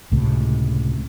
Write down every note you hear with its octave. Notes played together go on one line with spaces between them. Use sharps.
C#2 A2 C3